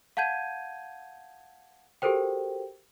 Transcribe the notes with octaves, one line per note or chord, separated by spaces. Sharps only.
F5 F#5 A5 G6 G#6 D#7
F#4 G4 A4 A#4 C5 G5